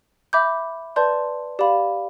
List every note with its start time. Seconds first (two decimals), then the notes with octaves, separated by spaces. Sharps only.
0.33 E5 B5 D6 G6
0.96 B4 D5 A5 C6 G6
1.59 G4 D5 F5 B5